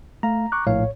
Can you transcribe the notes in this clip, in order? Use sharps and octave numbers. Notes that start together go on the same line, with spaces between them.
A3 F5 A#5
C#6 D6 F#6
A#1 A2 C#5 F5